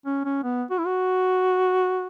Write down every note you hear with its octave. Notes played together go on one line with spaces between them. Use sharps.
C#4
C#4
B3
F#4
E4
F#4